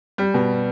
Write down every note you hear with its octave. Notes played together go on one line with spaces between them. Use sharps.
G3
B2